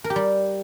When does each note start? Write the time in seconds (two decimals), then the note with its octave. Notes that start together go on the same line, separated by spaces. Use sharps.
0.04 A#4
0.10 G4
0.16 G3